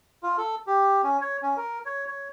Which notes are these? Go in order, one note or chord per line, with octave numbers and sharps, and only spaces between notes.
F4
A4
G4
C#4
C#5
C#4
A#4
C#5
C#5